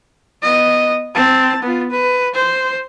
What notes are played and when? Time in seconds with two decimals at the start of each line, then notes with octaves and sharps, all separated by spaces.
0.43 B3 D#5
1.15 C4 A5
1.63 B3 F4
1.91 B4
2.35 C5